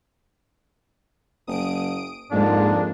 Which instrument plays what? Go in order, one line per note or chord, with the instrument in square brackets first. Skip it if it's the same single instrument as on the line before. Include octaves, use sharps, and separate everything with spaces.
[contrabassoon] F#1 [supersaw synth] D#6 D7
[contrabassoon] F2 [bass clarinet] G#2 [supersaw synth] F3 G#3 A#3 [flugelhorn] D4